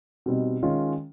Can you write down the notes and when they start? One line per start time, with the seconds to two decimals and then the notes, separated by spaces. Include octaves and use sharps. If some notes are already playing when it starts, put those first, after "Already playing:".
0.26 B2 G3 C4 D#4
0.62 D#3 G#3 C#4 F4